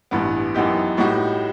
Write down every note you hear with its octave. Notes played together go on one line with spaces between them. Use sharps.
A1 G2 E3 B3
F#2 E3 B3 D#4 G4
A2 G3 D#4 F#4